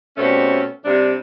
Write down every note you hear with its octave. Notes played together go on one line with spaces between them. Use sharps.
B2 G3 A3 C4 C#4
C3 G3 D4